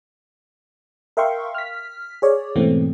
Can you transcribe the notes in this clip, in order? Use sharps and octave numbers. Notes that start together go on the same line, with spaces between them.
A#4 E5 F5 G5 C6 C#6
F6 B6
G#4 C#5 D5
G#2 B2 E3 A3 B3 C4